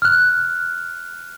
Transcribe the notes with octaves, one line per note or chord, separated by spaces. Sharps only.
F6 F#6